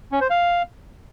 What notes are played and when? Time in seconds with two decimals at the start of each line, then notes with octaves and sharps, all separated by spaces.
0.12 C#4
0.21 C5
0.30 F5